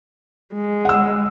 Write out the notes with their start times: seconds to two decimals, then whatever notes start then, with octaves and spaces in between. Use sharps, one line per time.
0.54 G#3
0.85 F#5 E6